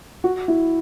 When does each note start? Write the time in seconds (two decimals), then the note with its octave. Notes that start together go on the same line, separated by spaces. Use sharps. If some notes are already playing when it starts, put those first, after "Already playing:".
0.24 F#4
0.48 E4